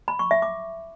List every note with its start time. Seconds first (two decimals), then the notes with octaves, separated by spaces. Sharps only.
0.08 B5
0.19 C#6
0.31 E5
0.42 D6